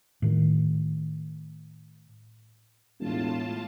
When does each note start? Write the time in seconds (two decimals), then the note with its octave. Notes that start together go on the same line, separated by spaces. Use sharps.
0.22 A2 D#3
3.00 E1 A2 F4 A5